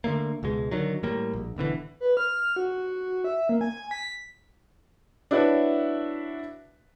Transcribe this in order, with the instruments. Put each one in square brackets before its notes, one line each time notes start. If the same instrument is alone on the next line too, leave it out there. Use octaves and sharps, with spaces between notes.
[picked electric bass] D3 E3 A3 A#3
C#2 B2 G#3
D3 D#3 F#3
A2 G3 A#3
A#1
D1 B2 D3 E3
[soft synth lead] B4
F6
F#4
E5
A#3
G#5
B6
[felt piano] D4 E4 F#4 B4 C#5 E5